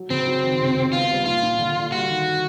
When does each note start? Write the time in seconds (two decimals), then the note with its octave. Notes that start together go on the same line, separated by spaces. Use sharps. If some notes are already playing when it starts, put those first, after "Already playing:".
Already playing: F#3
0.10 C#3 C4
0.27 F#3
0.44 D#3
0.60 C#2
0.76 C#2
0.93 B3 F4
1.10 G3
1.26 A#2 F4
1.43 A#2
1.59 D3
1.76 D3
1.92 G3 F#4
2.09 D#3